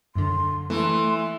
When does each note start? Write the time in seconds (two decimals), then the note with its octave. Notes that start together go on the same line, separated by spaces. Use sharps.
0.15 F#2 D3 C6
0.70 E3 A3 C6